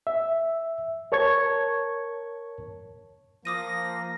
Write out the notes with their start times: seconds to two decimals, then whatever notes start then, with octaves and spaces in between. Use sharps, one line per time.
0.07 E5
1.12 A#4 C#5 A5 C#6 G#6
3.45 F3 A#3 D6 D#6 A#6 D#7